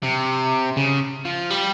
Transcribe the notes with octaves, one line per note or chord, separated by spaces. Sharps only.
C3
C#3
F3
G3